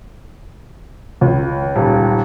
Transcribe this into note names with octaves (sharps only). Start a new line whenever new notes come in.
C#2
D#1